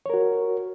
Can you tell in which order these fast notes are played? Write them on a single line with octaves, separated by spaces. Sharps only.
C#5 A#4 F#4